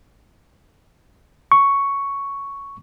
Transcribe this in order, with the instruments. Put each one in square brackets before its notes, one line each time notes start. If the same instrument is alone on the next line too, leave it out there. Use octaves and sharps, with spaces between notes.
[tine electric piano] C#6